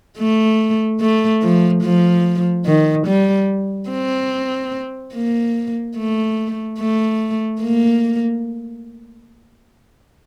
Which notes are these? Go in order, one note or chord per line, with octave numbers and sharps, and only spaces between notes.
A3
A3
F3
F3
D#3
G3
C4
A#3
A3
A3
A#3